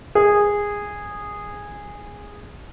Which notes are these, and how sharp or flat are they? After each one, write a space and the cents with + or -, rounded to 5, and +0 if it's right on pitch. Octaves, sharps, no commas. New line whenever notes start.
G#4 -15